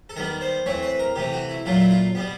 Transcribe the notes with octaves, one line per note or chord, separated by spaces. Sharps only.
A4
D#3 G3 B3 A#4
C5
E3 A3 C4 C#5
B4
A#4
C3 E3 A3 G4
F#4
E4
A#2 F#3 A3 F4
E4
F4
B2 G3 B3